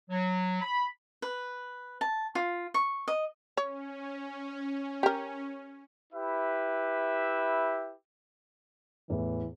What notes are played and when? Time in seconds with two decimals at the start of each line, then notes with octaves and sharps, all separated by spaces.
0.10 F#3
0.61 B5
1.22 B4
2.01 A5
2.35 F4
2.74 C#6
3.08 D#5
3.57 C#4 C#5
5.03 G4 A#4
6.13 E4 G4 B4 E5
9.10 E2 A2 E3